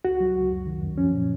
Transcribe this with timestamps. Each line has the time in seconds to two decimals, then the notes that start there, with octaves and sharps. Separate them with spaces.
0.05 C#2 F#4
0.20 F#3
0.36 C#2
0.51 F#2
0.67 D#3
0.82 F#2
0.98 F3 C#4
1.14 A#2